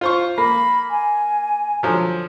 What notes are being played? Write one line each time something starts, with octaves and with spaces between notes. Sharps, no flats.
F4 C5 C#6
A#3 B5
G#5
D3 F3 F#3